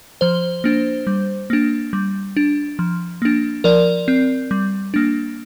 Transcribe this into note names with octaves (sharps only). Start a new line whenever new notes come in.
F3 C5
A#3 D4
G3
A#3 D4
G3
D4
F3
A#3 D4
F3 A#4 D5
C4
G3
A#3 D4